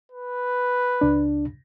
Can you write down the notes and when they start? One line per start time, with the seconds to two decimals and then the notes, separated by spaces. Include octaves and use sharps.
0.12 B4
1.01 C#2 D4